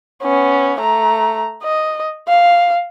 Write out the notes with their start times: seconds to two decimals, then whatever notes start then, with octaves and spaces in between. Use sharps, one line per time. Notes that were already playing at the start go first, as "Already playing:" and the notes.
0.23 B3 C#4
0.80 A3 A#5
1.63 D#5
2.28 F5